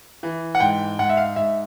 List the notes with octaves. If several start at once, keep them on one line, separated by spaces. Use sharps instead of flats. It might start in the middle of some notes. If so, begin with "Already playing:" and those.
E3
F#5
G#2 G5
G#2 F#5
E5
F5
G#2 E5